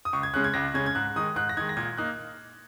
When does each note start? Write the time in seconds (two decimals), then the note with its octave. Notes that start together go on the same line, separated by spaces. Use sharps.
0.05 D#6
0.13 C#2 C#6
0.23 G#6
0.34 C#3 G#3 C#4 F#6
0.44 G#6
0.54 C#2 A#6
0.74 C#3 G#3 C#4 G#6
0.86 G#6
0.95 G#2 F#6
1.16 D#3 G#3 D#4 D#6
1.36 G#2 F#6
1.49 A#6
1.57 D#3 G#3 D#4 G#6
1.69 A#6
1.77 A#2 G#6
1.97 A#3 D#4 F#6